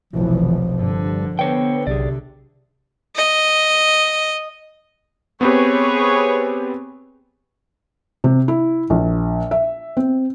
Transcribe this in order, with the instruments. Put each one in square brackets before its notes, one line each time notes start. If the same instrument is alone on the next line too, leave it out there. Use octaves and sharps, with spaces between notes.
[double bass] F1 B1 [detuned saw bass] E3 [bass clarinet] F3
[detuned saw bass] G2 [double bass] D3
[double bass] D3 [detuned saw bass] B3 [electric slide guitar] C5 C#5 G5
[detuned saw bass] B1 [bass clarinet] C3 [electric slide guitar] G#4 D5
[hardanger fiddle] D#5
[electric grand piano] B3 C4 G4 [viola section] G#4 B4 C#5
[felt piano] C3
E4
A#1
E5
C4